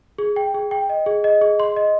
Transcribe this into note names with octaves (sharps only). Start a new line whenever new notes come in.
G#4
G5
G#4
G5
D#5
G#4
D#5
G#4
C6
D#5